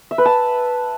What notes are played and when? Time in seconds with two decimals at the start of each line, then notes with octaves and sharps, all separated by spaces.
0.11 E5
0.18 B4
0.25 A5